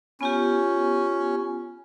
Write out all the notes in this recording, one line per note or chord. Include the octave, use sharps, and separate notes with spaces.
B3 C#4 F4 G4